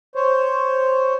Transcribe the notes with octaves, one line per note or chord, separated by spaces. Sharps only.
C5 C#5